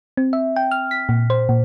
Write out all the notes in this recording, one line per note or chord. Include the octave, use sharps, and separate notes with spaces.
C4
E5
G5
F6
B6
A#2
C5
A#2